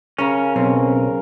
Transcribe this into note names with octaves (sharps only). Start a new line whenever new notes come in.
C#3 C#4 A#4
B1 C4 C#4